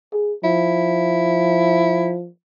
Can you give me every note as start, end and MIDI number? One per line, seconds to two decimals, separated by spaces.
0.13 0.33 68
0.44 2.28 53
0.44 2.16 64